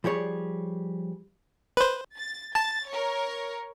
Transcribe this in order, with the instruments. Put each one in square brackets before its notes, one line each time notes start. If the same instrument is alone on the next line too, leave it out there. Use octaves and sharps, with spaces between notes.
[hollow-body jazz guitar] F3 G3 G#4 C#5
[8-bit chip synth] B4 C5
[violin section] A6
[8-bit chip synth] A5 [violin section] A6
[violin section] A#4 C#5